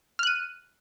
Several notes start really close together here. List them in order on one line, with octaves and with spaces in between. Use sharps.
F6 F#6 D#7